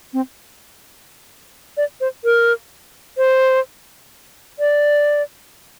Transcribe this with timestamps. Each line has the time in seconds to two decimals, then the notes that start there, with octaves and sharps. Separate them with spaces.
0.13 C4
1.77 D5
2.01 C5
2.24 A#4
3.18 C5
4.59 D5